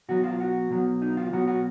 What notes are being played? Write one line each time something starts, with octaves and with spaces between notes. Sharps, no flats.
B2 F#3 F#4
F4
F#4
B2 F#3
D#4
F4
B2 F#3 F#4
F#4